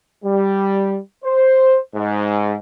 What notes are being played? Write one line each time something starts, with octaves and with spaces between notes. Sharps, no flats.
G3
C5
G#2